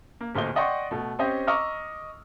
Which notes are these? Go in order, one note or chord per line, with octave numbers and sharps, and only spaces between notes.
A#3
D1 A#2 A3 C5 D#5 G7
D5 D#5 F#5 G5 C6 C#6
B2 A3
C4 C#4 G4 C5 C#5 D#5
D#5 A#5 C#6 D6 E6 F6